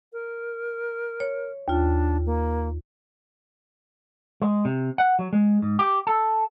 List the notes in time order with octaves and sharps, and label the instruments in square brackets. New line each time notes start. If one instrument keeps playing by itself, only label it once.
[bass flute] A#4
[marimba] C#5
[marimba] D#2 F4 [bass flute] D4
[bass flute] A#3
[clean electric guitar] G#3
C3
F#5
F#3
G#3
G#2
G4
A4